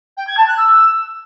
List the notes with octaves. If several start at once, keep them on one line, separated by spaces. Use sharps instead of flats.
G5
G#6
A5
F#6
E6